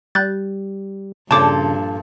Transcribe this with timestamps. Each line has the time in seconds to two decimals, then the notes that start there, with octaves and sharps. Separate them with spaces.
0.15 G3 F#6 G6 A6
1.31 G2 A#2 C#3 F3 A4 A5 D6